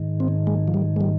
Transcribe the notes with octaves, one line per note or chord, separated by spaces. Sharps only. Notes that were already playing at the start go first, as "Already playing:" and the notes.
Already playing: G#2 D#3
C4
G#3
F3
G3
G#3
G3